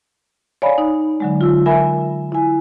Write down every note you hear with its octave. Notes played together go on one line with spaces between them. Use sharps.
C#5 D5 F5 G#5 A#5 B5
D#4
D3 F#3 G#3
F4 E6
A#4 E5 G#5 B5
E4 G#5